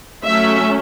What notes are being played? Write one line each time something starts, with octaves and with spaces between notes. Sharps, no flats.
F#3 A3 C#4 E5